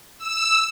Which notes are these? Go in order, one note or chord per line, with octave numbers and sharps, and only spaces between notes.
E6